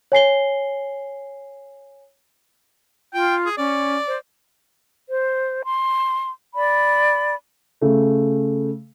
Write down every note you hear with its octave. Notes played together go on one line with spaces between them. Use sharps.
C#5 G#5 C7 G7
F4 G5
G#4
C#4 D5
C5
C5
C6
D5 B5
C#3 A3